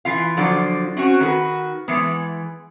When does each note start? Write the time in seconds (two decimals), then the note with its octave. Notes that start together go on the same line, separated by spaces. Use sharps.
0.05 E3 F4 F5
0.37 D3 F3 F#3 D4 F4
0.97 C4 C#4 F#4
1.20 D#3 F#4 A#4 B4
1.88 E3 G#3 B3